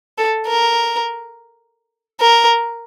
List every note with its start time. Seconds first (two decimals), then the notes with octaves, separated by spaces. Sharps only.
0.18 A4
0.47 A#4
2.21 A#4